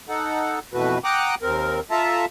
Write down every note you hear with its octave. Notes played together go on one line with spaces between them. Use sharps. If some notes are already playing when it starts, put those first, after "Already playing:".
D#4 A4 F#5
F2 B2 E3 A3 F#4 B4
F#5 G5 A#5 D6 D#6 F#6
D#2 C4 A#4
F4 A4 E5 A5 A#5